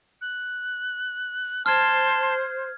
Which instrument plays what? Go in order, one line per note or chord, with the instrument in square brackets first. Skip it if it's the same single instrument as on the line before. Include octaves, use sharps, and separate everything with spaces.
[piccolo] F#6
[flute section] C5 [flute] A5 [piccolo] C6 [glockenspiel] F6 G#6